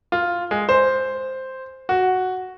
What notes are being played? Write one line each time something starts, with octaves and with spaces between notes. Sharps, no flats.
F4
G#3
C5
F#4